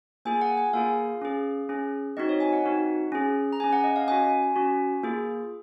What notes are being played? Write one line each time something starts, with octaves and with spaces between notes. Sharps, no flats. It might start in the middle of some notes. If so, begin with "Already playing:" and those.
A#3 F4 G#4 G#5
F#5
G#5
A#3 F4 G#4 F5
C#4 G#4
C#4 G#4
C4 D#4 F#4 D#5
C#5
G#5
F#5
C4 D#4 F#4
C#4 G#4
A#5
C#4 G#4 G#5
F#5
D#5
F5
C#4 F#4 G#5
C#4 F#4
A#3 F4 G#4